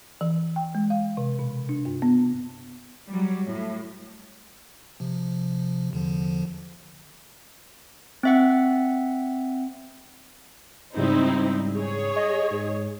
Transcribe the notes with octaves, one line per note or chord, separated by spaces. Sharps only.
E3
G5
G#3
F5
C3
B2
D4
G2
B3
F#3 G3
A2
C3 F3
E2 D3 F3
C4 E5 F#5
G#2 C#3 G3 C4 D#4 E4
G#4 C#5
D#5
G#2